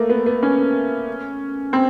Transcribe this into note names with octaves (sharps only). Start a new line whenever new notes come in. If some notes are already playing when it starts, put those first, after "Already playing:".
Already playing: A3 A#3
B3
B3
C#4
C4